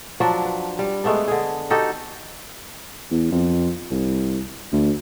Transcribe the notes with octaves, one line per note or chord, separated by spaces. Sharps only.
F3 F#3 D4
B4
G3
G#3 A3 B3 D4
D3 G#4
D#4 F#4 G4 A4
E2
F2
C2
D2